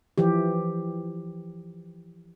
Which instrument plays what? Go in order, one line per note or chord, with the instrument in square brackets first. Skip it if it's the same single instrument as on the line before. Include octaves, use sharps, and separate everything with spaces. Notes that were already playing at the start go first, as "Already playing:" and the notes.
[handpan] E3 F3 G4